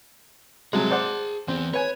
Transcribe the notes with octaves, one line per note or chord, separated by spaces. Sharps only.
C3 F#3 G#3 G#4 A5
C5 D5 F#5
E3 B3 C4
B4 C#5 G#5